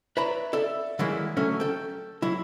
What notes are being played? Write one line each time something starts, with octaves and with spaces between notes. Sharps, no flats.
B4 C#5 D5 E5 A#5 B5
A4 D5 E5
D#3 E3 F#3 G#3 A#3 E4
D3 F#3 A3 C#4
A4 G5
F#3 E4